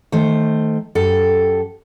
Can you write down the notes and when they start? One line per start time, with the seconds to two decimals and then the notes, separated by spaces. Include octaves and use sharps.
0.12 D#3 A3 C5
0.95 F#2 G4 A4